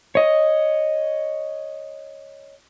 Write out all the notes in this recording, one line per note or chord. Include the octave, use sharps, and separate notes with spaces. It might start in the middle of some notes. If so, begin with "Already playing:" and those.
C#5 D#5